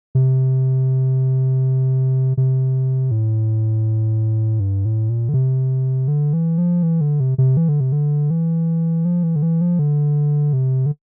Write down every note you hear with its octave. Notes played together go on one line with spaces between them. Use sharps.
C3
C3
A2
G2
A2
A#2
D3
C3
D3
E3
F3
E3
D3
C3
C3
E3
D3
C3
D3
E3
F3
E3
D3
E3
F3
D3
C3
D3